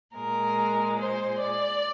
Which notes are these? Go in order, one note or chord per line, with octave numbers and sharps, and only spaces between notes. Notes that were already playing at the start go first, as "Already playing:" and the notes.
A#2 G#3 A#4
C5
D5